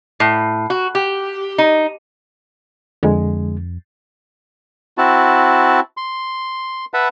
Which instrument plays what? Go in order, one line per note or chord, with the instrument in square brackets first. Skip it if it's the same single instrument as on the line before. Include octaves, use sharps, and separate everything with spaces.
[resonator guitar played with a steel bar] A2
F#4
G4
D#4
[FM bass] F2 [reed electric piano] D3 G#3
[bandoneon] C4 E4 F#4 A5
C6
B4 E5 F#5 A5 B5